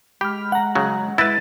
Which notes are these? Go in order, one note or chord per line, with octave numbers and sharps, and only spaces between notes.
G#3 G4 B5 F6
F#5 A#5
C#3 F#3
G#3 E4 B4 A6